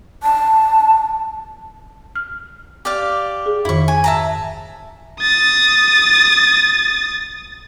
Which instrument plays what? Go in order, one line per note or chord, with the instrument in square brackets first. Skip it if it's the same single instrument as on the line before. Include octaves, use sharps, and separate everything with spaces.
[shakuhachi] A5
[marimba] F6
[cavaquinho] G4 D5 F5
[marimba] G#4
[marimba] F2 G#2 D#3 [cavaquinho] E4 C#6
[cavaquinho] G#5
E5 A5 A#5
[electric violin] D#6 A6